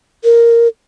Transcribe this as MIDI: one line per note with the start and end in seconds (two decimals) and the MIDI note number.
0.24 0.68 70